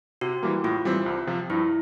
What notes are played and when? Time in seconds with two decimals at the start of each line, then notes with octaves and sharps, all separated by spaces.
0.21 C3 F#4
0.43 E3 G3 A#3
0.64 A2 F4
0.85 E3 G3 C4
1.06 C2
1.27 C3 F3
1.50 G2 E4